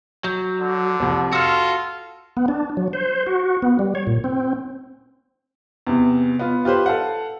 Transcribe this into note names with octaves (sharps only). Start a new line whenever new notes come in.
F#3 G6
D3
C2 F2
F4 F#4 A4 E6 F6
B3
D4
F#3
C5
F#4
B3
G3
C#5
A#2
C4
E2 C3
B3 F4
F4 G4 B4 C5
A4 F5 F#5